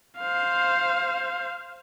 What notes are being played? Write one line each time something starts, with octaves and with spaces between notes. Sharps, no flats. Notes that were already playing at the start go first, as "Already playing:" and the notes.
C5 F5